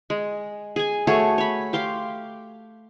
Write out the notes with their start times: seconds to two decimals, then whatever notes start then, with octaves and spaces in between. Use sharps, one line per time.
0.10 G#3
0.76 G#4 G#5
1.07 A3 F#4 G#4 C#5
1.38 C#5 B5
1.73 G4 F5 C6 D6